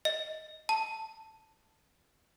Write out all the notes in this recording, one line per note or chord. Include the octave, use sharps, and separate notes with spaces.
D#5
A5